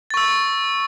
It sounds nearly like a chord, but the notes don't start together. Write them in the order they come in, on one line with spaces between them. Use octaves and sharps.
A6 C#6 E6